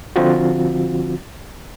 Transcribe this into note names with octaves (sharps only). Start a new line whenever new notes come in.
D3 F3 C4 F4 F#4